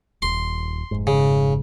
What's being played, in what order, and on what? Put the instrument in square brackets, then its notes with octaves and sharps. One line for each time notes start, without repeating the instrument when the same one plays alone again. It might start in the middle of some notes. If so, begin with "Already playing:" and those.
[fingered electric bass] D#1 [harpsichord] C6
[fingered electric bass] F1 G#2
[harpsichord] C#3